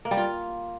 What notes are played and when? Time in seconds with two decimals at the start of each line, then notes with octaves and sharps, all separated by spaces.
0.05 A#3
0.11 G3
0.17 F4